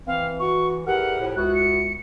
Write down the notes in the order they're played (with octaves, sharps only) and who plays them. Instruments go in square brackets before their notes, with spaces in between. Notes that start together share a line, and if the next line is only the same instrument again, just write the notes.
[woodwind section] E3 [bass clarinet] C4 [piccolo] F5
[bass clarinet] F#4 [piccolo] C#6
[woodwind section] E2 A#4 [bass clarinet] G4 [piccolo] F#5
[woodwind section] F2 A2
[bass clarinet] C#2 [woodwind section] B3 E4 F#4 [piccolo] F#6
[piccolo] C#7